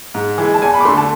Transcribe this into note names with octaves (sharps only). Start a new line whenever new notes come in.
G#2
E3 G#3
A5
E2 G#5
B5
D6
D3 A3 C6
A5